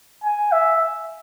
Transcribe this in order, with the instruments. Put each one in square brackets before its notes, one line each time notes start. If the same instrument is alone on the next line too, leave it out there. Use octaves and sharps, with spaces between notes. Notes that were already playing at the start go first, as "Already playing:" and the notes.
[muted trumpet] G#5
E5